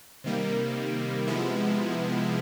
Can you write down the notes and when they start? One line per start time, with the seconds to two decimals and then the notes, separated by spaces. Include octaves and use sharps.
0.24 C3 D#3 G3 A#3
1.27 C3 F3 G#3 B3 E4